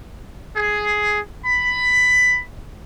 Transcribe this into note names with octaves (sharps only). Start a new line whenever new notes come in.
G#4
B5